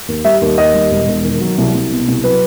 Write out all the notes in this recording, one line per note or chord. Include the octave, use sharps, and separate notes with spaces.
D#2
G3 E5
D#2
D#2 D#5
G3
E1
E1
D#3
F#3
C2
C2
B2
C2
F#3 B4